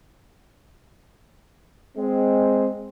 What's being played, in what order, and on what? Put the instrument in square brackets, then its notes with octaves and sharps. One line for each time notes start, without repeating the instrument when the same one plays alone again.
[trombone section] G#3 C4